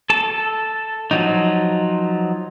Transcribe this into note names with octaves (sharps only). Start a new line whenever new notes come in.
A4 A5
F3 F#3 D#4